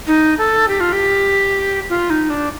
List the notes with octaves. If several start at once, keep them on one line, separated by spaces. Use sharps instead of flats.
D#4
A4
G4
F4
G4
F4
D#4
D4